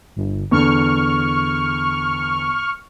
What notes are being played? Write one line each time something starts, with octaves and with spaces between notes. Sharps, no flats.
G1
E2 D3 C#6 F6